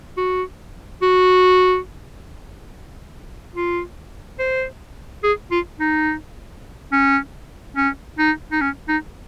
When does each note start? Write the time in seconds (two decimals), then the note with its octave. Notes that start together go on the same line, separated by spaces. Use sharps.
0.17 F#4
1.02 F#4
3.55 F4
4.39 C5
5.24 G#4
5.51 F4
5.80 D#4
6.92 C#4
7.76 C#4
8.18 D#4
8.52 D#4
8.61 C#4
8.88 D#4